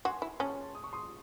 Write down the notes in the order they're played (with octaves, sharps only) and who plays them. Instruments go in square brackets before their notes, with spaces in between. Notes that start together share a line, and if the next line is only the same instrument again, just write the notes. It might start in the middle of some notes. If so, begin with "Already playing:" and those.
[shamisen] F#4 [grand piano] G#5 C6
[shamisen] E4
[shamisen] C#4 [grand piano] A5 C#6
[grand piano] D#6
C#6
C6 D#6